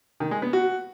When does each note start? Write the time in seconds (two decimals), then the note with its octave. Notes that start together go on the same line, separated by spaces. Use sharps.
0.20 D#3
0.31 G#3
0.42 B3
0.53 F#4